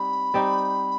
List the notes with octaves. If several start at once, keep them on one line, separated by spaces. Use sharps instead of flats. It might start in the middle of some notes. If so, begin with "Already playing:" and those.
Already playing: G3 C4 D#4 B5
G3 C4 D#4 G4